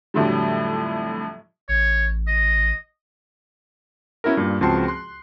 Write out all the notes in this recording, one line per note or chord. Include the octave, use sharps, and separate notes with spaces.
F2 A2 D3 F#3 G3
A1 C#5
D#5
B3 C#4 E4 F#4 A#4
G2 A#2
C#2 F3 C4 F#4 A5 C6
C6 F#6